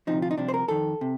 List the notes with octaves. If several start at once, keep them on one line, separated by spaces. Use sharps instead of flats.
D2 C3 F3 D#4
F4
D#4
C2 C3 F3 D4
C5
A#4
F2 D#3 A4
C3